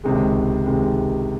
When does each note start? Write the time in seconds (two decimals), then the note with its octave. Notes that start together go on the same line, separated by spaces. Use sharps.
0.04 C#2 C3 D#3 G#3
0.66 C#2 C3 D#3 G#3